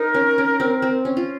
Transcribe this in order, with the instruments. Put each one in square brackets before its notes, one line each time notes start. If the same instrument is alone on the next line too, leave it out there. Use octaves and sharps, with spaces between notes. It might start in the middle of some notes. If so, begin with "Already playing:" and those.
Already playing: [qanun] D#4 [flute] A#4
[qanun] C#4
C#4
C4
C4
C#4
F4